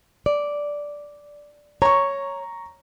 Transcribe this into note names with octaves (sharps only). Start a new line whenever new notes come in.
D5
C#5 A#5 C#6